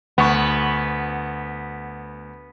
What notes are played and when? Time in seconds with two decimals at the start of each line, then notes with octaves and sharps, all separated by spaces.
0.18 D2 B3 C#6